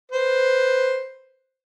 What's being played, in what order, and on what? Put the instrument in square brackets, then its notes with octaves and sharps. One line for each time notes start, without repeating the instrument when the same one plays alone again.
[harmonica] B4 C5